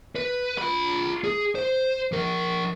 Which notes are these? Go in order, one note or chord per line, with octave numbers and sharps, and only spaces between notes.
B4
F4 B5
G#4
C5
F3 A#4